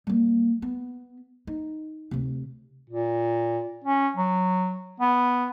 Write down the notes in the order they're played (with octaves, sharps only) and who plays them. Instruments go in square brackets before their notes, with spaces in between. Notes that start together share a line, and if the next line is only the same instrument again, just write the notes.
[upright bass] G3 A#3
B3
D#4
D2 C3
[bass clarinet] A#2
C#4
F#3
B3